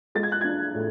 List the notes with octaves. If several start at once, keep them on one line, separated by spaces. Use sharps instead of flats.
G#3 A6
G#6
F#6
D4 G#6
A2